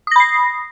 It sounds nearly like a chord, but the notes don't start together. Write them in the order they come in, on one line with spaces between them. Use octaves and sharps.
D#6 A#6 B5 C7